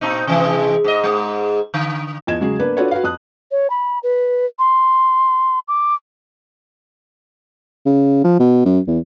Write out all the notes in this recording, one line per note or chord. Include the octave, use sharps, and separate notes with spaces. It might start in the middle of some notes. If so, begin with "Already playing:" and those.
A#2 C4 D#4
C3 E3 G#3
G#2 D#5
G#2 G#3
D3
E2 F3 D#5 G#6 E7
C#3 F#3 G#3 G#4
A#3 B3 D4 B4
D4 F4 F#4 A4 B4 C#5
F#4 B4 F5
F2 D#6 F#6
C#5
B5
B4
C6
D6
C#3
F3
B2
F#2
E2